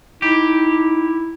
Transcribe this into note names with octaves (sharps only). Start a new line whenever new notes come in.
D#4 E4 G4